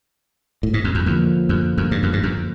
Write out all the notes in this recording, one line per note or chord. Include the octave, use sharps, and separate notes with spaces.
A2
G#2
F2
E2
E2 D3 F3 A#3
F#2
F#2
G2
F#2
G2
F#2